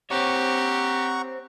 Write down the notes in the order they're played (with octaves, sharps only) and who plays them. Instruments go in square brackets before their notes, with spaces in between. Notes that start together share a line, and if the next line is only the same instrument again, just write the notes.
[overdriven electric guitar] C4 C#5 [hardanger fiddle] G4 [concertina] F#5 A#5 C#6